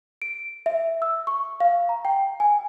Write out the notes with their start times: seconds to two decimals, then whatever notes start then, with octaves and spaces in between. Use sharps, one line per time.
0.22 D7
0.66 E5
1.02 E6
1.27 C#6
1.60 F5
1.89 A#5
2.05 G5
2.40 G#5